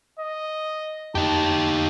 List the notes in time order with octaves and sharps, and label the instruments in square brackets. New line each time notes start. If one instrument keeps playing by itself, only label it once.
[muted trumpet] D#5
[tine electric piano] F2 [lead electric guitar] D#4 G4 [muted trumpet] A5